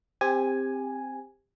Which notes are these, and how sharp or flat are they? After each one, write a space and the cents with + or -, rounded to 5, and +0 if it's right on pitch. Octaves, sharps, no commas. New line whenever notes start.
C4 +0 G4 +25 G#5 +0